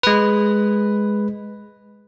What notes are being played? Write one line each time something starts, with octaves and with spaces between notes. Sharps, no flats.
G#3 B4